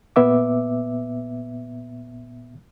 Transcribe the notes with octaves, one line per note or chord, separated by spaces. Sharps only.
A#2 B3 E5 D6